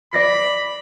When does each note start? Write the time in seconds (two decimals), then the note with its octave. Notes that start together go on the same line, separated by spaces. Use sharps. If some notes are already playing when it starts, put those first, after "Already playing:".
0.13 D5 B5 A#6 C7